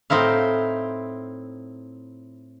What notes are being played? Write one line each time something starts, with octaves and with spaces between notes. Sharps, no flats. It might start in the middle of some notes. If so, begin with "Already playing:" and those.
A2 C4 D#4 E4 F5